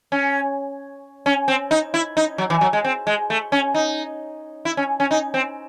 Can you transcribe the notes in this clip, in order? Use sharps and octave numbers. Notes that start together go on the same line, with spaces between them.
C#4
C#4
C4
D#4
E4
D#4
F#3
E3
F#3
G#3
C4
G#3
A3
C#4
D#4
E4
C#4
C#4
D#4
C4